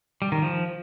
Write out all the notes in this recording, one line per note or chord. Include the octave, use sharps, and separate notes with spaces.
G3
D#3
F3